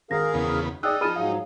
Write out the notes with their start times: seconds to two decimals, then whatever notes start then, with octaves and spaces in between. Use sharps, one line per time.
0.11 G#1 G#4 A#4 F5 A#6
0.34 E2 C#3 B3
0.83 D#4 G#4 D5 G5 E6 F#6
1.01 F3 G#4 A5 B5 F6 D#7
1.16 G#2 F#3 F5